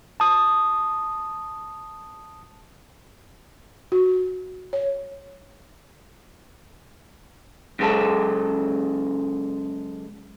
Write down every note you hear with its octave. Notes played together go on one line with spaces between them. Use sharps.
A5 D#6
F#4
C#5
F#2 C#3 G#3 A4